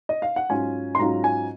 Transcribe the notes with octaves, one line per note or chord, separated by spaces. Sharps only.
D#5
F5
F#5
G#2 F#3 C#4 F4 G#5
C6
G#2 F#3 C#4 F4 A#5
G#5